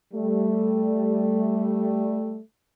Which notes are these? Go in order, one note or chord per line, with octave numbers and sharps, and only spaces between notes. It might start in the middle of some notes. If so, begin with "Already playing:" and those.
G3 A3